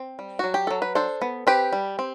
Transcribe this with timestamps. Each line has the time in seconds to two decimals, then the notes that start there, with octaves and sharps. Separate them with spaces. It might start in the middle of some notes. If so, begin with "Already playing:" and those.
Already playing: C4
0.19 G3
0.39 F#3 F#4
0.54 G4
0.67 F#3 A4
0.82 B4
0.95 D4 A4 C5
1.22 B3
1.47 C4 G4 B4
1.73 G3
1.99 C4